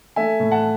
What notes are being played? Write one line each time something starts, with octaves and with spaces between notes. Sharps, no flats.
A3 E5 G#5
A2
F#5 A5